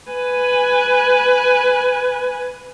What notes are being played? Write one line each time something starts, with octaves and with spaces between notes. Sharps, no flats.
B4 G#5